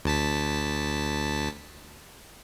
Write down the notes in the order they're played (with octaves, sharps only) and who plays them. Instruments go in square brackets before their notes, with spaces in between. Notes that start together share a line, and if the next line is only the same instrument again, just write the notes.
[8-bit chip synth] D2 A5 B6